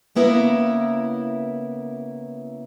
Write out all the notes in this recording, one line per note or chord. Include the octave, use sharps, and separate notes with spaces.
C#3 A#3 B3 E4 A#4